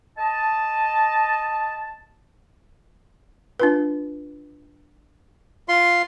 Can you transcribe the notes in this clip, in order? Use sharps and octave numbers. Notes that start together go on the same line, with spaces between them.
D#5 A5
D4 F4 B4
F4 C6